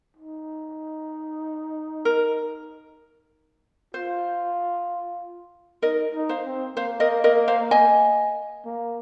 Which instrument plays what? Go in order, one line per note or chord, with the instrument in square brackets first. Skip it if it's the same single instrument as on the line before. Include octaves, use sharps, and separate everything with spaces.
[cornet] D#4
[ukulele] A#4
[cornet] F4 [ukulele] C5
[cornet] D#4 [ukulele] A#4 D#5
[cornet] D#4
[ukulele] C5 F5
[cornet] C4
[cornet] A#3 [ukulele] C5 F5
[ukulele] A#4 D#5
A#4 D#5
C5 F5
D#5 G#5
[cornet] A#3